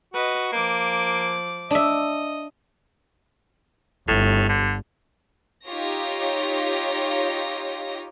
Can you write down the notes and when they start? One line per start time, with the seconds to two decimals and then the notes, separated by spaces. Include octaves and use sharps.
0.14 F#4 B4 D#5
0.52 F3 A#3 D6
1.71 D4 D#5 E5
4.08 G1 A2
4.49 D3
5.66 D#4 F4 G4 C#5 A#6